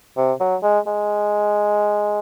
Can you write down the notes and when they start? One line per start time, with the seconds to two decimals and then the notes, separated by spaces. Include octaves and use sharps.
0.17 C3
0.39 F#3
0.63 G#3
0.86 G#3